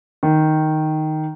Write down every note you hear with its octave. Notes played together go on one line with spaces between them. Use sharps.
D#3